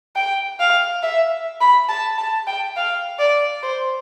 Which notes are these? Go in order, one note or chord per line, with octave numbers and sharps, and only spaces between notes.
G5
F5
E5
B5
A5
A5
G5
F5
D5
C5